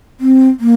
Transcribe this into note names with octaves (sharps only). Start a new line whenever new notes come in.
C4
A#3